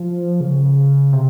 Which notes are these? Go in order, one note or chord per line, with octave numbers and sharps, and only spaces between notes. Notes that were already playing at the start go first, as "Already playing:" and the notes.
Already playing: F3
C#3
C3